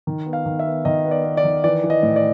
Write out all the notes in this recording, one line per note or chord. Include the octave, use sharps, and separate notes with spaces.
D#3
B3
F5
D#3
E5
B3
D#3 D#5
B3
D5
B3
D5
D#3
E3 D5
E3
D#5
A2
D5